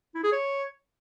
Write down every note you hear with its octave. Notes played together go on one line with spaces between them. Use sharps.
E4
G#4
C#5